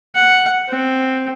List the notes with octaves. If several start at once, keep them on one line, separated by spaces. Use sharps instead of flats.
F#5
C4